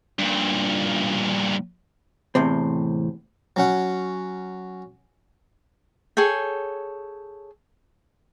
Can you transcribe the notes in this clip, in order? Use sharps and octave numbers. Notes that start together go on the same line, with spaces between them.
G2 A#2
E2 A2 C3 C4
F#3 C#4 F#5
G#4 A4 C#5 G5